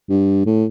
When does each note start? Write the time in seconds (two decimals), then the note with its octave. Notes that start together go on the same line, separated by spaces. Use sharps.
0.10 G2
0.46 A2